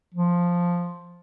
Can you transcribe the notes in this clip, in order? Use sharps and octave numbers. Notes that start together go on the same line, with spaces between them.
F3